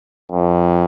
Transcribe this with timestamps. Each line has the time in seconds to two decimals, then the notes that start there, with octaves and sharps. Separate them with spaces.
0.32 F2